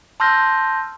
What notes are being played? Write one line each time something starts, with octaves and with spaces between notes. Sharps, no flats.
A5 C6 E6 F6 G6 A#6